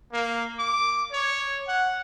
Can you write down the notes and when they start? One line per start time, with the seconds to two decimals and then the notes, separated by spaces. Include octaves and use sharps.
0.11 A#3
0.59 D6
1.12 C#5
1.66 F#5